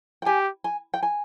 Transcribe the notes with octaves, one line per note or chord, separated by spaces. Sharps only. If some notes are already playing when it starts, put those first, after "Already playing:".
G5
G4 G#5
G#5
G5
G#5